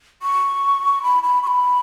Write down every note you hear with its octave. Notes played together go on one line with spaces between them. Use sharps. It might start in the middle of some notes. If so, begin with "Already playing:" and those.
C#6
B5
B5
C#6
B5